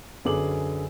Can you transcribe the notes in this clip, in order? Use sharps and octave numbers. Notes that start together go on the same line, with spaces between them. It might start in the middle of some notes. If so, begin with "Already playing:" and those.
F#2 D3 G#4 B4 D6 F#7